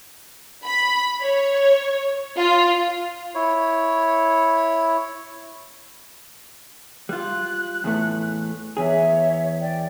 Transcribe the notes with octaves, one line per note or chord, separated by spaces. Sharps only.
B5
C#5
F4
E4 C#5
G3 F4 F#6
E2 A2 A3
E2 G#4 C#5 E5
D5 G5